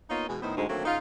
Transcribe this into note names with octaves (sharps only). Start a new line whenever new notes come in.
A#3 B3 D#4 F4 C#5 D#5
B2 E3 G#3
A2 D#3 B3 D#4 C5
D2 G#2
D3 D#3 F#3 A3 A#3 C4
G#2 C#3 D#4 F4